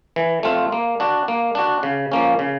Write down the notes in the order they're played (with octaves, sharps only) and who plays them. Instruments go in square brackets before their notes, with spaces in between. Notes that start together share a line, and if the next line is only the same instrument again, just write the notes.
[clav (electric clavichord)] E3
A3 C4 F4
A#3
D4 F#4
A#3
D4 F#4
C#3
F3 A#3 C#4
C#3